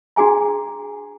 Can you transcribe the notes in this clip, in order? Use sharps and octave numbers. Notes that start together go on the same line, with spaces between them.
D4 F#4 G#4 G#5 A#5